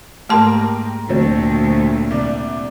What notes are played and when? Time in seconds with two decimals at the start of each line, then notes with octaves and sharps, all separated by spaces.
0.29 G#2 A3 A#3 G4 A#4 A5 C6
1.09 D2 A#2 F#3 C4
2.10 C2 D5